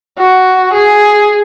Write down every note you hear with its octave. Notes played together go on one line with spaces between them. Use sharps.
F#4
G#4